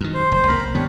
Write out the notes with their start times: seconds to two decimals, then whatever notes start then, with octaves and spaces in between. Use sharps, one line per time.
0.01 F#2 D#3
0.14 C5
0.32 F1 C5
0.48 C#2 G#3 A#3 A#4 B5
0.60 B1
0.75 G#2 D#3 B3 D4 G4 C#5